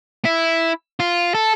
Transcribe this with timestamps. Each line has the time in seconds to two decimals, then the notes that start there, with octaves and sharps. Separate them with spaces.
0.25 E4
1.00 F4
1.34 A4